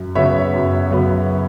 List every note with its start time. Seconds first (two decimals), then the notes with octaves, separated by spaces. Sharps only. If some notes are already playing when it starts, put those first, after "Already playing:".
Already playing: F#2
0.15 C#3 F#3 B3 C#5 E5
0.54 F#2
0.91 C#3 F#3 B3